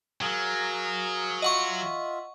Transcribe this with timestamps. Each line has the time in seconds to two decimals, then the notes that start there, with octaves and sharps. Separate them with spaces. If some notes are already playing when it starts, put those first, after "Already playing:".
0.21 F#3 G#4 A#4 F5
1.42 F4 D#5 E5 F#5 C#6